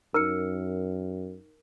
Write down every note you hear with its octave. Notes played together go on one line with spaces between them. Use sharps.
F#2 D#4 A#4 F6 C#7